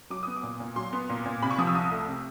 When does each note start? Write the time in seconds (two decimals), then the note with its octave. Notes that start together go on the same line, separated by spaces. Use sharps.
0.10 F#3 D6
0.23 B3 D#6
0.36 D6
0.43 A#2
0.60 A#2
0.76 F#3 C6
0.93 B3
1.10 A#2
1.26 A#2
1.42 C3 B5
1.51 C#6
1.58 F3 D#6
1.67 E6
1.75 C2 D#6
1.91 A3
2.08 C3